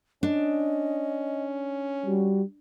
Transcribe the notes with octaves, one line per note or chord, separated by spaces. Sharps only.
C#4 D4 D#5
G3 F#4